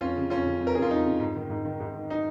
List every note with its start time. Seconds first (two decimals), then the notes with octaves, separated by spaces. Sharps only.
0.01 F2 C#4 F4
0.16 C#3
0.30 F2 C#4 F4
0.46 C#3
0.61 F2
0.67 A#4
0.75 C#3 G#4
0.82 F4
0.90 F2 D#4
1.06 C#3
1.20 G#2
1.36 D#3
1.50 G#2
1.65 D#3
1.80 G#2
1.94 D#3
2.10 D#4